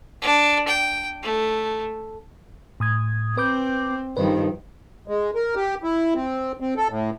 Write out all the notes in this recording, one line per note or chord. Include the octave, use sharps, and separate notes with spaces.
D4
G5
A3
A2 D#6 G#6
C4 B4 D6 G6
G2 D#3 F3 B4 C5
G#3
A#4
G4
E4
C4
C4
A4
A2